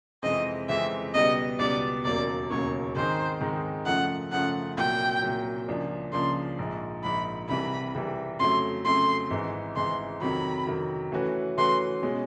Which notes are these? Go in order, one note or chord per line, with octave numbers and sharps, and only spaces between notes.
F2 C3 E3 G#3 C4 D#5
F2 C3 E3 G#3 C4 E5
C#2 B2 G3 B3 D#5
C#2 B2 G3 B3 D5
E1 D#2 C#3 F#3 A#3 D5
E1 D#2 C#3 F#3 A#3 C#5
G#2 D#3 G#3 C4 D#4 C5
G#2 D#3 G#3 C4 D#4
F#2 C#3 F3 A3 F#5
F#2 C#3 F3 A3 F#5
C2 A#2 F#3 G5
C2 A#2 F#3
C#2 C#3 F3 A#3 D4
C#2 C#3 F3 A#3 D4 C6
A#1 G#2 F3
A#1 G#2 F3 B5
C2 C3 E3 G3 B5
C2 C3 E3 G3
F2 C#3 F#3 A3 C6
F2 C#3 F#3 A3 C6
G#1 G#2 E3
G#1 G#2 E3 C6
F2 C3 D#3 F#3 B5
F2 C3 D#3 F#3
E3 A3 C#4 F#4 B4
E3 A3 C#4 F#4 B4 C6
B2 G#3 C#4